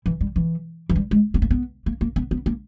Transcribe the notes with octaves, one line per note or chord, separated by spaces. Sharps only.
E3
G3
E3
E3
G3
G#3
B3
A#3
B3
A#3
A#3
B3
B3
A#3